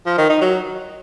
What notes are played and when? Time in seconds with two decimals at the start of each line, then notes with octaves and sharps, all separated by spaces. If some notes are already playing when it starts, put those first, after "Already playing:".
0.06 F3
0.18 D#3
0.30 D#4
0.41 F#3